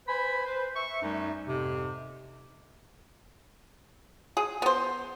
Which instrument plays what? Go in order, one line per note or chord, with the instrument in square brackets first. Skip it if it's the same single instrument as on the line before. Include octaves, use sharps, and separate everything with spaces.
[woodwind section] B4 C5 G#5 B5
B4 C5
E5 C#6
F#2 G3 A3 D#4
F2 G#2 C3
[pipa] G#4
B3 C5